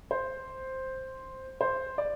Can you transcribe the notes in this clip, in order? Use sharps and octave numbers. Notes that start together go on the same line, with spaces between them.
C5
C5
D5